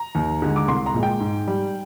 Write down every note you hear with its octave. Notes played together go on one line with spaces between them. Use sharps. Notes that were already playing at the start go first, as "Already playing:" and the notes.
Already playing: A#5
D#2
D3 G#3
D6
C2 C6
A#5
A#2 G#3
G5
G#2
G3